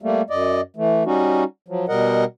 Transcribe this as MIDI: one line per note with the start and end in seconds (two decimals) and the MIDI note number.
0.02 0.22 55
0.02 0.22 57
0.02 0.22 58
0.30 0.61 42
0.30 0.61 74
0.30 0.61 75
0.76 1.03 52
0.76 1.03 57
1.06 1.44 55
1.06 1.44 61
1.06 1.44 63
1.06 1.44 66
1.68 1.86 53
1.68 1.86 54
1.88 2.24 47
1.88 2.24 55
1.88 2.24 70
1.88 2.24 75
1.88 2.24 78